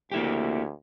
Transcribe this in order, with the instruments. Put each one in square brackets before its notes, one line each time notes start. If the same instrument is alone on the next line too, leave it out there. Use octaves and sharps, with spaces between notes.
[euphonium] D2 [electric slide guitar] A#3 E4 G4